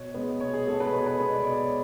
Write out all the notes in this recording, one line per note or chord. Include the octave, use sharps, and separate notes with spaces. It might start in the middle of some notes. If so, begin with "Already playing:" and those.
Already playing: B2 C#5
G#3 B3
B2 C#5
G#4
G#3 B3 A4
B4
B2 C#5
B4
G#3 B3 C#5
D5
B2 C#5
D5